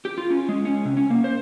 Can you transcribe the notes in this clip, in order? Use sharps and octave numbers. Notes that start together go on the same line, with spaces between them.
G4
F4
C#4
G#3
C#4
C3
C#4
A#3
C5